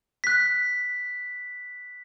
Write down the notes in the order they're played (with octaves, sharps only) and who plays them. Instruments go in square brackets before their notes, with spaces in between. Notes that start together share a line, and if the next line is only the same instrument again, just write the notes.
[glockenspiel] F#6 B6